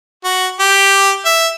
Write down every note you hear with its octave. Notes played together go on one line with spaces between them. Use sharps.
F#4
G4
E5